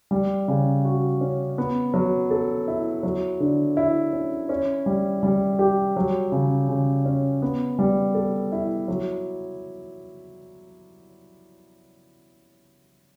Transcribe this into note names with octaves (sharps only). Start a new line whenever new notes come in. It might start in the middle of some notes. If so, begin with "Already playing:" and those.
G3
C#3
F#4
C#4
B3
F#3
A4
E4
F#3
D3
E4
C#4
C#4
G3
G3
G4
F#3
C#3
C#3
C#4
B3
G3
A4
E4
F#3